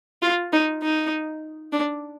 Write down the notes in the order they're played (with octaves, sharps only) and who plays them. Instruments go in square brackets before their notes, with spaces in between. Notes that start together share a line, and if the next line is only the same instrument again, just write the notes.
[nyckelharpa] F4
D#4
D#4
D4